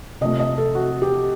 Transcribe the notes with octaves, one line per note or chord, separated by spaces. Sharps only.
C3 F3 A3 D#5
D#5
A4
F#4
G4